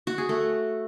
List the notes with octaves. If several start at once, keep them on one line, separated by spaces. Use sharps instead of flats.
F#4
G#4
A3